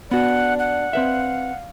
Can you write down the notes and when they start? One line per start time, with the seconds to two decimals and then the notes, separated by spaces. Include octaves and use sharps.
0.11 B3 D4 F#4 F#5
0.59 F#5
0.93 C4 B4 E5 F5